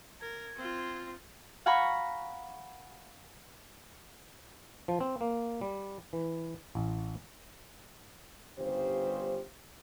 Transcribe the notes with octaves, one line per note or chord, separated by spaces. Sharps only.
A#4 G#6
C4 F4
F5 F#5 G#5 A#5 B5 C#6
F3
C4
A#3
G3
E3
A1
G1 G2 C#3 G4 C5